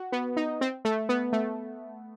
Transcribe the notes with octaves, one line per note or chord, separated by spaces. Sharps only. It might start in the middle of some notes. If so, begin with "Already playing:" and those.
Already playing: F#4
B3
D#4
C4
A3
B3
A3